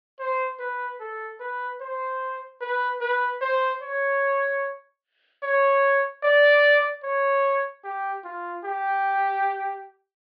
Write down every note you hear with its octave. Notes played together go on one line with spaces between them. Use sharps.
C5
B4
A4
B4
C5
B4
B4
C5
C#5
C#5
D5
C#5
G4
F4
G4